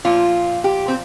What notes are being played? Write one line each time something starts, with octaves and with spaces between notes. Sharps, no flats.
A#2 F3 F4
G4
C4